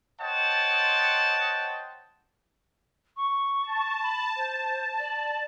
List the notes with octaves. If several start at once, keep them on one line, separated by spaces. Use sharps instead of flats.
C5 C#5 D#5 F#5 G5 A5
C#6
A5
B5
C5
D5